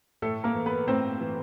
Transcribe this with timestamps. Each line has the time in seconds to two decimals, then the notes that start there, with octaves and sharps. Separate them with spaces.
0.22 A2 A3 A4
0.44 A#3 A#4
0.55 E3
0.66 B3 B4
0.88 A2 C4 C5
1.20 E3